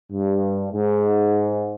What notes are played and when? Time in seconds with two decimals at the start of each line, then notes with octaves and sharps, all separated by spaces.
0.12 G2
0.73 G#2